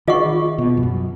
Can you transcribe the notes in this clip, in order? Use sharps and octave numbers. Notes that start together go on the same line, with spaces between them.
D#3 F4 G#4 D#5 F#5 C#6
B2
F2
F#2